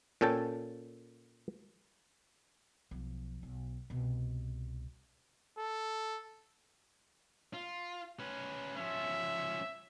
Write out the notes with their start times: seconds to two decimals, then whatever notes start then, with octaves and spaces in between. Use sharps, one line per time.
0.21 A#2 C#4 A4 G5 A5
2.91 B1 F3
3.43 B1
3.90 C2 B2
5.58 A4
7.54 F4
8.20 C#4 B4
8.76 F3 C#4 E5